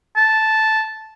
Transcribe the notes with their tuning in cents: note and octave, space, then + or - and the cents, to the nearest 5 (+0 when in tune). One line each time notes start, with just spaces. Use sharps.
A5 -5